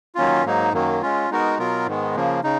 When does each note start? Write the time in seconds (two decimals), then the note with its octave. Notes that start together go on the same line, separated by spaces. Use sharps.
0.15 D#3 F#3 A#3 C#4 F4
0.45 G#2 F#3 A#3 D#4
0.72 F#2 D#3 F#3 A#3
1.02 G#3 C#4 F4
1.30 G#3 B3 D#4 F#4 A#4
1.58 B2 F#3 B3 F4 A#4
1.87 G#2 D#3 G#3 B3
2.16 C#3 F3 A#3
2.44 C#3 D#4